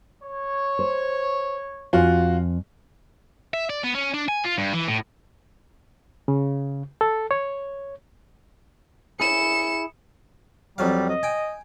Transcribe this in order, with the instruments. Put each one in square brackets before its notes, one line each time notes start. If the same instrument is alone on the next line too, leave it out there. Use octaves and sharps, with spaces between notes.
[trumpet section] C#5
[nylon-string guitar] C5
[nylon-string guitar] F2 G#5 [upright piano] F4 F#4
[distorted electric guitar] E5
D5
B3
C#4
D4
G#5
F4
G2
E3
A2
[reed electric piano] C#3
A4
C#5
[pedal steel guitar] E4 G#4 [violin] C#7 E7
[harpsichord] F2 F#3 F5 [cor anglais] G3
[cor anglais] D#5
[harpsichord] G5 G#5